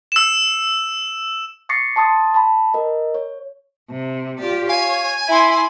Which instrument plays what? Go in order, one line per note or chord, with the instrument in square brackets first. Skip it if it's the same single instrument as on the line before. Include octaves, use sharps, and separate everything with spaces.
[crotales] E6 E7
[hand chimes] C#6 D6 A6 A#6 C7 C#7
A5 C6 D#6 A6
A5 B5
A#4 D#5
C#5
[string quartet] C3
F4 G4 D5
[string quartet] C#5 [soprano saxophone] F5 [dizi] G#5
[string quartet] E4 C6 [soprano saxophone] E5